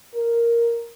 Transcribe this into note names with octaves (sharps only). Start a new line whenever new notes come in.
A#4